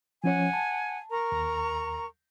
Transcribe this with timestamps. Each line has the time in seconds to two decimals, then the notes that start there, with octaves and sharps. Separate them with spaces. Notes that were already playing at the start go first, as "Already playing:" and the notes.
0.24 F3 C#4 C#5 F#5 G#5
0.53 A5
1.10 A#4 A#5 C#6
1.32 D#2